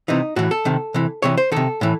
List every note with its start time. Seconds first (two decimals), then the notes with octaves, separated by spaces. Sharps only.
0.08 C3 E3 D#4
0.36 A2 E3 F#4
0.51 A4
0.65 C3 D#3
0.94 C3 E3
1.22 C3 E3 C#5
1.37 C5
1.52 C3 D#3 A4
1.81 A2 E3